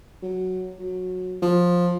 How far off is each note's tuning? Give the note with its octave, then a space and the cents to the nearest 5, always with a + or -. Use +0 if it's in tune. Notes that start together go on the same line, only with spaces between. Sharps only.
F#3 +0
F#3 -15
F3 +15